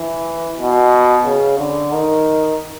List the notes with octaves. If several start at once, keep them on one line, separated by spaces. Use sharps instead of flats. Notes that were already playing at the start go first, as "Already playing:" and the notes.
Already playing: E3
B2
C#3
D3
D#3